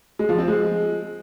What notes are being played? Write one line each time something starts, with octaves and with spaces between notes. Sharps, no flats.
G#3
F3
C4
G#3